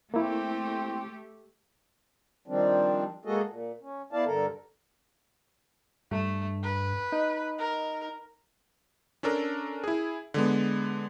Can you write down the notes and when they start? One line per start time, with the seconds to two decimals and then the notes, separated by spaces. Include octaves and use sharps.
0.14 A3 A#3 C4 E4 G4
2.48 D#3 F3 G3 C4 D4
3.25 G#3 A#3 F#4 G#4 A4 D#5
3.47 A#2
3.82 C#4
4.13 B3 E4 D5 F5 A5
4.25 G2 D3 A4 A#4
6.11 G2 A3
6.63 B4
7.12 D#4
7.59 A#4
9.23 C#4 D4 A4 A#4
9.84 E4 G#4
10.34 D3 G#3 B3